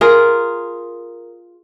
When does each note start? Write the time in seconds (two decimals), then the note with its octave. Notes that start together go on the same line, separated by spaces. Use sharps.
0.01 F4 G#4 A#4